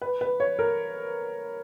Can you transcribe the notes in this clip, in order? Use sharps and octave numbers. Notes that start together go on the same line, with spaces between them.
B4
B4
C#5
A#4